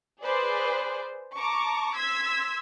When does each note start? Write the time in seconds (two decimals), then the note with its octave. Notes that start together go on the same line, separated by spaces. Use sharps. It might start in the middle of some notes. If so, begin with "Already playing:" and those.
0.22 G#4 B4 C5 D5
1.37 A5 A#5 C#6 D6
1.97 C6 E6 G#6 B6